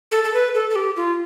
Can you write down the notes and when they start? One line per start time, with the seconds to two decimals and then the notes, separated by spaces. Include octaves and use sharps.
0.12 A4
0.24 A4
0.34 B4
0.55 A4
0.70 A4
0.76 G4
0.97 F4